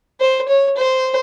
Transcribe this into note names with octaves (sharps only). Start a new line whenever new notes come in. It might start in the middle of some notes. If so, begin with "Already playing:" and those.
C5
C#5
C5